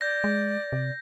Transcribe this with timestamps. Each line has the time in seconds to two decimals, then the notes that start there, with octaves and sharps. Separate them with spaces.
0.01 D5 G6 A#6
0.24 G#3
0.72 C3